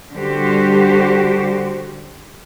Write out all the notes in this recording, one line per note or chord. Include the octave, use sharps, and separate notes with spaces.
D3 G3 F#4 G4 C5